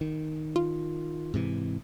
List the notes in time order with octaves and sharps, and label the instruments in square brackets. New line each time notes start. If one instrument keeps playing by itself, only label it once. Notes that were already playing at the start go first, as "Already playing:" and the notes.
[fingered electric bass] D#3
[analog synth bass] F4
[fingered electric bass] G#2 C3 E3